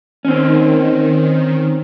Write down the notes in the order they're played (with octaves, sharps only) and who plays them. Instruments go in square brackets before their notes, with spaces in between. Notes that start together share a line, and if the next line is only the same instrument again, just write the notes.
[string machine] D#3 [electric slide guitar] C4 C#4